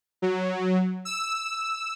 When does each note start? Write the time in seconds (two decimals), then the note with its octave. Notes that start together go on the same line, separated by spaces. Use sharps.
0.22 F#3
1.05 E6